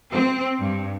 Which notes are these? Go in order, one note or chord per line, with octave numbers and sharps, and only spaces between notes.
C4
G2